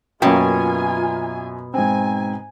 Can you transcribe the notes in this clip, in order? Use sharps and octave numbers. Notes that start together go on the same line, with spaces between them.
F#2 B2 A#3 C#4 F4 G5 G#5
G#2 C4 G#5